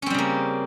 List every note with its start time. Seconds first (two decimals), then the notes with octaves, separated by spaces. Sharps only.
0.02 C#4
0.06 C4
0.10 G3
0.14 C#3
0.18 A#3